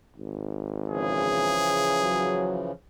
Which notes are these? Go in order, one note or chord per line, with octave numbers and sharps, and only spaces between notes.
G#1
C#3 E3 F3 G#4
F#3